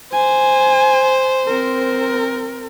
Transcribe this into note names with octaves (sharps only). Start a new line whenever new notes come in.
C5 G#5
C4 A#4